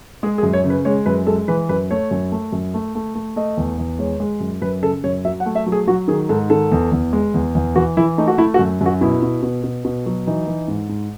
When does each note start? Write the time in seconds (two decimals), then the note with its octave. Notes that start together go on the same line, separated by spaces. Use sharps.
0.23 G#3 G#4
0.38 G#4
0.43 F#2
0.53 C#5
0.64 C#3
0.70 B4
0.85 G#3 C#5
1.06 F#2 B4
1.27 G#3 A4
1.48 E3 B4
1.69 F#2 B4
1.91 A3 C#5
2.11 F#2
2.32 A3
2.52 F#2
2.74 A3
2.95 A3
3.15 A3
3.36 A3 D#5
3.58 E2
3.78 E2
3.99 G#3 C#5
4.20 G#3
4.40 F#2
4.62 F#2 B4
4.82 C#3 A4
5.04 F#2 C#5
5.25 F#3 E5
5.40 F#5
5.46 A3
5.55 E5
5.66 F#3
5.72 G#4
5.87 F#3 F#4
6.08 D#3 G#4
6.29 G#2 A4
6.50 D#3 A4
6.72 E2
6.92 E2
7.13 G#3
7.34 E2
7.55 E2
7.76 E3 F#4
7.97 E3 E4
8.18 A3 D#4
8.28 F#4
8.38 A3 E4
8.54 F#4
8.59 F#2
8.81 F#2 F#4
9.01 B2 E4
9.22 B2
9.43 B2
9.64 B2
9.85 B2
10.06 F#3
10.27 E3 D#4
10.47 E3
10.68 G#2
10.89 G#2